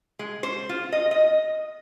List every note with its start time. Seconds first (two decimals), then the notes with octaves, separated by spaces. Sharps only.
0.19 G#3
0.43 C5
0.69 F4
0.92 D#5
1.11 D#5